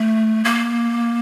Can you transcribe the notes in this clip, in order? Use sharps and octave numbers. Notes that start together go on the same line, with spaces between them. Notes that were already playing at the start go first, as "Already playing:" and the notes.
Already playing: A3
A#3